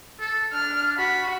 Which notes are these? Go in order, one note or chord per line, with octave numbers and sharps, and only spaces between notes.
A4
D4 F6
F#4 B5